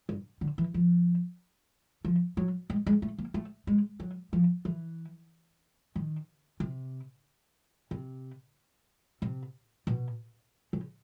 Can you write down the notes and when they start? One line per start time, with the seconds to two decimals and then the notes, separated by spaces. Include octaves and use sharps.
0.09 G2
0.41 D3
0.58 E3
0.74 F3
2.05 F3
2.37 F#3
2.70 G#3
2.86 G#3
3.02 A3
3.18 A#3
3.34 A3
3.67 G#3
4.00 F#3
4.33 F3
4.65 E3
5.96 D#3
6.60 C3
7.91 C3
9.22 C3
9.87 B2
10.73 C#3